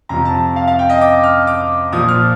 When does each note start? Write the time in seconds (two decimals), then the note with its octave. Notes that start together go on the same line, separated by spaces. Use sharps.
0.09 F2 C3 F3 A#5
0.25 A5
0.56 F5
0.67 F5
0.79 G5
0.89 D#5
1.01 D6
1.23 F6
1.47 D6
1.92 A#2 F3 D#6
2.08 F6